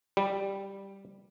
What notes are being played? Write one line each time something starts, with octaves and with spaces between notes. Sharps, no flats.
G3